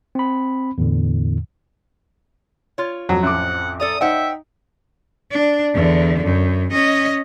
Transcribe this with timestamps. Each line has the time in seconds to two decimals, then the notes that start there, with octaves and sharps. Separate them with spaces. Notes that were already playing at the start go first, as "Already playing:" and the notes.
0.15 C4 B5
0.78 E2 A2 D3
2.78 F4 C#5
3.09 F2 F#3
3.23 A1 F#5 D6
3.80 A4 D5 A#5 D#6
4.01 D#4 C5 E5 F#5 G5
5.31 D4
5.74 E2 D3
6.24 F#2
6.71 C#4 D#5